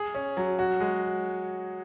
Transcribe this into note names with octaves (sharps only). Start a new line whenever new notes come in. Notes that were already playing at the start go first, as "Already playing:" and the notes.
Already playing: G#4
C#4
F#3
F#4
G#3